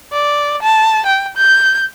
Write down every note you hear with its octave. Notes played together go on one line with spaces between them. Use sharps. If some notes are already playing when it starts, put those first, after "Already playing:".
D5
A5
G5
G6